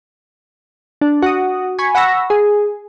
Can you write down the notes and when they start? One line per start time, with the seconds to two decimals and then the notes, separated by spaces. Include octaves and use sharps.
1.01 D4
1.22 F#4 D#6
1.79 G#5 B5 C#6
1.95 F#5 B5 C#6 E6 A#6
2.30 G#4